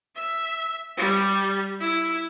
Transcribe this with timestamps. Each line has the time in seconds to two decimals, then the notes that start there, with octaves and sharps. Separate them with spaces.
0.16 E5
0.97 G3
1.80 E4